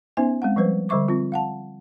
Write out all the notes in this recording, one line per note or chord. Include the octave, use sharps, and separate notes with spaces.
B3 C#4 D#4 C5 E5 G#5
G#3 C4 F#5
F3 G3 B4 C5
D3 G3 C5 E5 C#6 D6
C4 F4
F5 F#5 A5